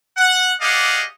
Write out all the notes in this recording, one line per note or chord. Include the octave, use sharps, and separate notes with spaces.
F#5
G4 G#4 D5 D#5 F5 F#5